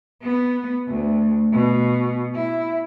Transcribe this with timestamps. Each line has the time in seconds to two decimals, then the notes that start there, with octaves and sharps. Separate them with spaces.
0.22 B3
0.88 D2
1.53 B2
2.35 E4